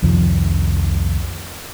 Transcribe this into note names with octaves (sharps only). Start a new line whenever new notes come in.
C2 F2 D#3 F3